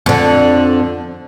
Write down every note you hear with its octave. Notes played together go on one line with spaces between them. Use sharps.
F2 D3